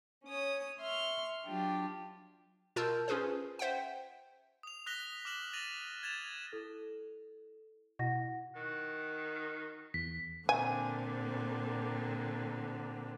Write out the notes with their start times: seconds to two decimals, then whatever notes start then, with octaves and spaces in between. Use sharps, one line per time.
0.25 C#4 C#5 D#6
0.80 E5 C6 C#6 F6
1.46 F#3 D4 F4 G4
2.76 B2 F4 A#4 A5 E6 G6
3.08 C#4 F4 G#4 B4 C5
3.59 C5 E5 F#5 G5
4.63 D#6 F7
4.86 D#6 F#6 A#6 B6 F7 G7
5.25 D6 F6 E7 F#7 G7
5.53 A6 A#6 D#7 F7 F#7
6.03 G#6 A6 E7 F7
6.52 E4 A4
7.99 B2 E4 F#5 A#6
8.56 D#3 F#4
9.94 E2 B6
10.49 A#2 D3 C4 G#5